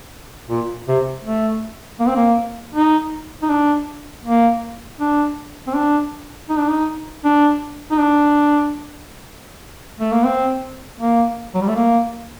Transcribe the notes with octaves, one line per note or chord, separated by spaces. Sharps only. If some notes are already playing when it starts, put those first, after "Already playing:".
A#2
C3
A3
A#3
C4
A#3
D#4
D#4
D4
A#3
D4
C4
D4
D#4
D4
D#4
D4
D#4
D4
A3
A#3
C4
A#3
F#3
G3
A3
A#3